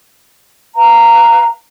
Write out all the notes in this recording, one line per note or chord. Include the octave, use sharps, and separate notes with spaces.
B4 F5 A#5